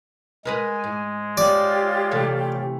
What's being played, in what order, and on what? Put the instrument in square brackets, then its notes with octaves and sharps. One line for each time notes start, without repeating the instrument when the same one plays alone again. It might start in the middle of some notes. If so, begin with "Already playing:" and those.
[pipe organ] G#3 [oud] A#4 B4 D#5 [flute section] G#5
[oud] G#2
[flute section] F4 G4 C#5 [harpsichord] D5
[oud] C3 E3 A3